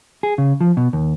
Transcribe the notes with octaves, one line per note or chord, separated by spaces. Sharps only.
G#4
C#3
F3
B2
D#2